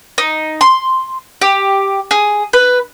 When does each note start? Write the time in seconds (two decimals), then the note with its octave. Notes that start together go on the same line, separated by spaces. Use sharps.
0.18 D#4
0.61 C6
1.41 G4
2.11 G#4
2.53 B4